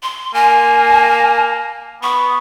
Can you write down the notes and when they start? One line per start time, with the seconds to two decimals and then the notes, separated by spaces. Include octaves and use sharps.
0.03 C6
0.34 A#3 G#5
2.03 B3 C#6